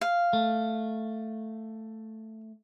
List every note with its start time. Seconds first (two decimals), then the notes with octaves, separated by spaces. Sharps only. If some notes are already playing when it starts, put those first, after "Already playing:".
0.01 F5
0.33 A3